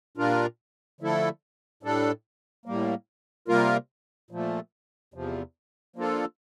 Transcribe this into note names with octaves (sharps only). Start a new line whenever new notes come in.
A#2 G3 D4 F4 A#4
D3 F3 A3 E4 A4
A2 G3 D4 A4
A2 G3 A#3
C3 G3 A#3 F4 A#4
A#2 F3 A3
E2 C3 F3
F3 A#3 D4 F4 A4